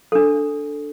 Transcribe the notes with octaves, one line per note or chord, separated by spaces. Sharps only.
D4 A4